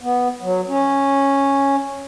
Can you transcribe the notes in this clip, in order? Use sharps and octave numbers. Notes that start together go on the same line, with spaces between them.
B3
F#3
C#4